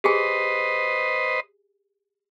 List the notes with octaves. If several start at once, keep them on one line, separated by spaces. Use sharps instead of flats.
G4 G#4 B4 C5 D#5 G#5